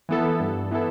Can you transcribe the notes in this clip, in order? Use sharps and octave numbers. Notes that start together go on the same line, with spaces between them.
E3 B3 E4 A4
G2
E3 B3 E4 A4